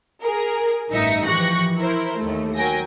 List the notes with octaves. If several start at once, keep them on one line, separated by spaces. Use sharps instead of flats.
G#4 A#4
A1 G2 D#4 E5 A#6 C#7
E3 F3 G4 C#6 F#6 A#6
E4 A#4 C5
D#2 A3
F#3 A#4 G5 G#5 A#6